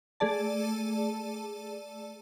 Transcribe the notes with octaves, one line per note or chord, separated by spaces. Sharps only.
A3 G#4 D5 A5